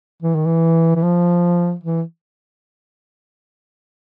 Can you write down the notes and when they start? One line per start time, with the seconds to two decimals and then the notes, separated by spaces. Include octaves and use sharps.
0.22 E3
0.35 D#3
0.46 E3
0.96 E3
1.02 F3
1.83 E3